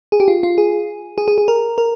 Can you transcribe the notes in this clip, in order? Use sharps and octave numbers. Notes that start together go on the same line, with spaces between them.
G#4
G4
F4
F4
G#4
G#4
G#4
G#4
A#4
A#4